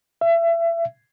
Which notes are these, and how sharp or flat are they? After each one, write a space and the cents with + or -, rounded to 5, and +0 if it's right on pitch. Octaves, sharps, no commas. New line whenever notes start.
E5 +30